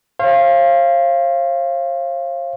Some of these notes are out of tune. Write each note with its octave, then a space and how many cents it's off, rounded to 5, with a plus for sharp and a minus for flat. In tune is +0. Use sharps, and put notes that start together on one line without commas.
C5 +45 F5 -20